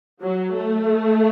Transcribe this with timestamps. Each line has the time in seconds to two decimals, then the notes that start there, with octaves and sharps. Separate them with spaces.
0.21 F#3
0.55 A3